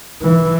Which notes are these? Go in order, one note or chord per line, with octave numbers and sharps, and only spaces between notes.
E3